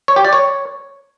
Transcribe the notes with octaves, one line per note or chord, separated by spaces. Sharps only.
C#5
G4
D5
C#5